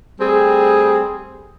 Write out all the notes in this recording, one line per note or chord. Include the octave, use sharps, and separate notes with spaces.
G3 A3 C4 G#4